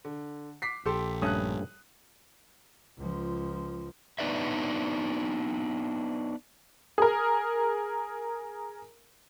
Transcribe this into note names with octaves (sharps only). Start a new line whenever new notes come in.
D3
D6 B6 C7
A#1 G4 A4 C6
G2 A3 C#4 D#6 F#6
C#2 F3
B3 D4 D#4 B4 D5 E5
G#4 A#4